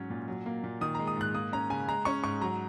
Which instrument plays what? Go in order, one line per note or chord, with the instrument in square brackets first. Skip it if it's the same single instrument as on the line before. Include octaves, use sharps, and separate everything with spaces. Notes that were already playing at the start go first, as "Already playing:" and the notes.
Already playing: [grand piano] G#2 F#3 C#4
A#2
F#3
A#3
A#2
D#3 D#6
G#3 A#5
D#6
G#2 F#6
A#3 D#6
C#4 A#5
C#3 G#5
G#3 A#5
C#4 C#6
G#2 C#6
F#3 A#5